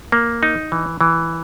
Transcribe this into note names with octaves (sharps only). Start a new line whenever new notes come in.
A#3
D#4
E3
E3